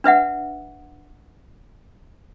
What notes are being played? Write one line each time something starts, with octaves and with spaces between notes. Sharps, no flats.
D4 B4 E5 F#5